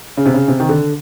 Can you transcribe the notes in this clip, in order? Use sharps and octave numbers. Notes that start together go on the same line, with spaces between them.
C#3
C3
C#3
C3
D#3
D3